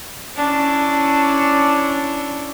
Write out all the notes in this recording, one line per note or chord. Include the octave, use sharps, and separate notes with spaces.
C#4 D4 E4